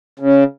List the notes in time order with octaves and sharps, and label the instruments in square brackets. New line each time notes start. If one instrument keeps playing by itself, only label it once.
[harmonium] C#3